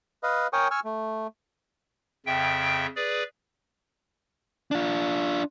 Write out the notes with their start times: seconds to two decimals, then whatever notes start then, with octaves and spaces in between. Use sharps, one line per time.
0.23 B4 D#5 F5
0.53 A#4 C#5 G5 G#5 C#6 D#6
0.71 G#5 C#6 E6 F6
0.85 A3
2.26 F2 C#3 E5 G5
2.96 G#4 B4 D5
4.71 D4 F4